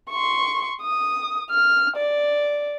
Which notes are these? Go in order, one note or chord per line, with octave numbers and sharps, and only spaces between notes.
C6 C#6
D#6
F6
D5